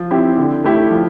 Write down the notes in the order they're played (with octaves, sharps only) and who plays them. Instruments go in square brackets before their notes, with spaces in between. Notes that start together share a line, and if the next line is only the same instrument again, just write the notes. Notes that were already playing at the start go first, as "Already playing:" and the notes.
Already playing: [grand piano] F3
C4 E4 G4
D3
A3 E4 G4
F3